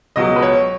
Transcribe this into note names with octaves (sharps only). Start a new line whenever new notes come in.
C#2 B2 F#3 D#5
B4
C#5